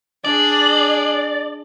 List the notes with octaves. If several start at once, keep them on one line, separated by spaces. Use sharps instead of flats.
D4 G#4 D5